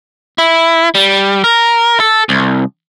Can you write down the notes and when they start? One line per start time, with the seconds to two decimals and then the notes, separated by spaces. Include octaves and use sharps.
0.38 E4
0.95 G3
1.44 A#4
2.00 A4
2.29 C2